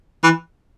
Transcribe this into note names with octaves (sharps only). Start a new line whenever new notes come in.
E3